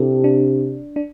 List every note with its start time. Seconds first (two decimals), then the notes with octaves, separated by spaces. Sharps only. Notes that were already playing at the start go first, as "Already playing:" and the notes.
Already playing: C3 D4 E4 G4 A4
0.24 D4
0.96 D4